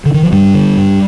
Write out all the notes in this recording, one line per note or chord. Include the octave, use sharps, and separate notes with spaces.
D3
D#3
F3
G2 G3
D3
G2